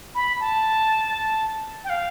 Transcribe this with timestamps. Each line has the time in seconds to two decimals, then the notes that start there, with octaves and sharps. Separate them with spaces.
0.15 B5
0.40 A5
1.84 G5
1.90 F5